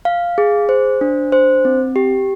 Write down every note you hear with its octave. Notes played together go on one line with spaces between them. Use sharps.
F5
G#4
C5
D4
C5
C4
G4